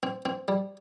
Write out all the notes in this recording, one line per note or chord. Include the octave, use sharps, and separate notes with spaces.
C4
C4
G3